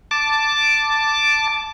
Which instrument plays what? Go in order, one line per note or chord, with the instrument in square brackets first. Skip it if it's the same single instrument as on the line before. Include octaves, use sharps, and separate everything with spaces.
[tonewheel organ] A5 D6